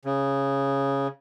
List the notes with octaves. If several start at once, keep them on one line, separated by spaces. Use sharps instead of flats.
C#3